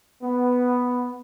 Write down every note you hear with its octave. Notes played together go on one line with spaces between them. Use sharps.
B3